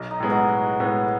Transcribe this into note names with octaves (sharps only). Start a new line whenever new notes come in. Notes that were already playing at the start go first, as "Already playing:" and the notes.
Already playing: B1
D#4
A2 G#3 B3
D#4 F#4
B1
A2 G#3 B3